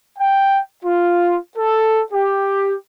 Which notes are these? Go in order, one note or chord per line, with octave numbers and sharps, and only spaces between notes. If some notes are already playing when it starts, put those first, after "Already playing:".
G5
F4
A4
G4